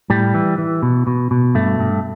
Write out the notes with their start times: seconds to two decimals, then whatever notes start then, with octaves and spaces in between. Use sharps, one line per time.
0.10 A2 G3
0.34 E3
0.58 E3
0.82 B2
1.07 B2
1.31 B2
1.55 G2 A3
1.80 G2